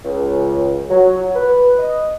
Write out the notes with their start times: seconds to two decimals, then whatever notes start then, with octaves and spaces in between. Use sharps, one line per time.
0.04 C#2
0.90 F#3
1.35 B4
1.79 D#5